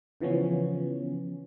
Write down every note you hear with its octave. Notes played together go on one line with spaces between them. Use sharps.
C#3 E3 F3 B3 C#4